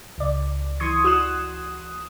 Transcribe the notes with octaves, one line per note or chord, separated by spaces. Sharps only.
C#2 D5
E3 C6 C#6 D#6 G#6
F#4 D#6 F#6 E7